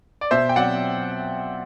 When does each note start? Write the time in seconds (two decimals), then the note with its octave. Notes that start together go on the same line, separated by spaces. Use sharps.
0.21 D5
0.31 B2 C5 E5
0.49 G5
0.56 F#3 C4 D5 F#5